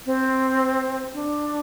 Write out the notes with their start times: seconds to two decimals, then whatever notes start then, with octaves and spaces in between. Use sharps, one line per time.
0.06 C4
1.13 D4